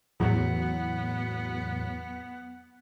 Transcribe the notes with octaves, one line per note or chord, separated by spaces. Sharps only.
E2 A2 F#3 B3